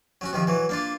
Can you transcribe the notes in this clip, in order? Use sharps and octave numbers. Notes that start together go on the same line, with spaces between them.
F#3 C#4 F#4
C3 D#3 F3
E3 F#3
A#3 D4 F4